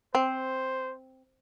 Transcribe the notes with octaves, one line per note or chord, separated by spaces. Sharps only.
C4 C5